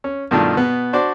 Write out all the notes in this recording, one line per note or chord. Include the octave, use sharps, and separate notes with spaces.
C#4
G2 B2 D#3 A3 D4 F4
B2 B3
D4 F#4 C5 D5